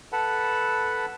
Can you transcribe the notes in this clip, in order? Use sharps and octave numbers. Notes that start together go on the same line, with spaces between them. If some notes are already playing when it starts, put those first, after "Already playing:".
A4 B4 F#5 A5 B5